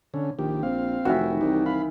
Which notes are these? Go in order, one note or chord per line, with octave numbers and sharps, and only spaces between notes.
D3 C#4
A#1 D#3 G4
A#1 C4 F5
F1 D#3 E3 F#4 E5
C2 D#4 G4
F5 B5